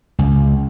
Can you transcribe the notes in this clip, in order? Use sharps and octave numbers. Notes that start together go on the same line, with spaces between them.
C#2